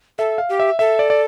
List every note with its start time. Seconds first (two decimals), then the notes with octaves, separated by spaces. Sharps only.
0.18 A4 E5
0.38 F5
0.49 G4
0.60 E5
0.79 A4 E5
0.99 D5
1.10 D5